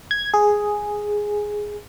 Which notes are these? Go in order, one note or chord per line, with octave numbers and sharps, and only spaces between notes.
G#6
G#4